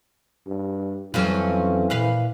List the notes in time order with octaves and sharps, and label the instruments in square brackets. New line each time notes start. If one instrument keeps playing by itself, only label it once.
[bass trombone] G2
[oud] F2 F#3 C#4 [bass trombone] E3
[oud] A#2 B4 F5